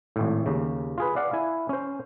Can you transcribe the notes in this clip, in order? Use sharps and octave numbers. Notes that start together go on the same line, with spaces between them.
G#1 A2
D#2 C#3
F4 G#4 B4
D5 F5 F#5
E4 G#5
C#4 C5